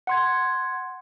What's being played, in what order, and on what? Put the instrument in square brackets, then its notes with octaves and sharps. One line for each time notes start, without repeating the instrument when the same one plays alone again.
[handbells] F#5 C6 G#6